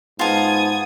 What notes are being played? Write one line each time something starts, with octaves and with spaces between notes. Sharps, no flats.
G#2 B3 F4 A5 D#6 G#6